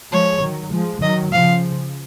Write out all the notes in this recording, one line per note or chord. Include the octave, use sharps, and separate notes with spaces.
F3 G#3 C#5
D#3 F#3
F3 G#3
D#3 F#3 D#5
C#3 F3 F5